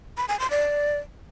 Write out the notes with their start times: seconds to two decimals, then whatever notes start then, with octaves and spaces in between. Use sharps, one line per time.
0.17 B5
0.28 G#5
0.40 C6
0.51 D5